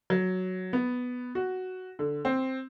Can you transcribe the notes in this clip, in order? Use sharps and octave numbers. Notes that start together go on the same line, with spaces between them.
F#3
B3
F#4
D3
C4